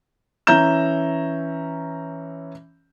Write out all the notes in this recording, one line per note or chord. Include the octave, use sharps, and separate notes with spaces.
E3 C#4 E5 A#5 G6 E7